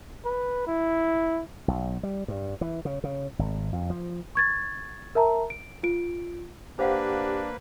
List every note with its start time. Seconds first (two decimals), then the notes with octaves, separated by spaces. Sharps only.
0.25 B4
0.67 E4
1.68 B1
2.03 G3
2.28 G2
2.61 E3
2.85 C#3
3.04 C#3
3.39 G#1
3.73 F2
3.90 F3
4.35 C#6 G#6 A6
5.15 A#4 E5 A5 A#5
5.50 D7
5.83 F4 D7
6.79 A#3 D4 G4 B4 C5 F5 F#5